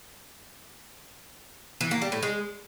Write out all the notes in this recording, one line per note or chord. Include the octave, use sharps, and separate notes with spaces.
E3
A#3
G3
A2
G#3